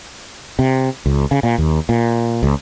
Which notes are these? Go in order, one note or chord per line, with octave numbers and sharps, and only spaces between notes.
C3
C#2
C#3
A#2
D#2
A#2
C#2